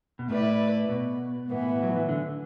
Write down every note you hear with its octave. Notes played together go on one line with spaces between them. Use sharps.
B2
A2 A3 E4 B4 D5
B2
A2 E3 B3
F#3
E3
D3